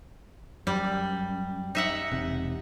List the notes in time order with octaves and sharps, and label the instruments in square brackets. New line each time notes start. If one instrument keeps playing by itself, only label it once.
[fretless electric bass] F#2 [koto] G3
[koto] D#4 E5 F#5
[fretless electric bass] E1 C3